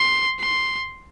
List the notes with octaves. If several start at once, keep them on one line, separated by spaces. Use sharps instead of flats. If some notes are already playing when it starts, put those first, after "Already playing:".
Already playing: C6
C6